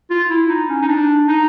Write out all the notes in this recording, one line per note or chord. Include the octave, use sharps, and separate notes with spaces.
F4
E4
D#4
C#4
D#4
D4
D#4